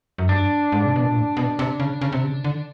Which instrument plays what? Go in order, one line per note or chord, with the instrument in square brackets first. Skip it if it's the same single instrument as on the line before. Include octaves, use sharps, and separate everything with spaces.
[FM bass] F#2
[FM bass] G2 [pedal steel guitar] D4
[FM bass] G#2
C3
B2
A#2
A2
B2
C3
C#3
C#3
C3
C#3
D3